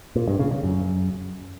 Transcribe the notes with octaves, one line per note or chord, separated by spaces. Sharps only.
A#2
G2
C#3
C#3
F#2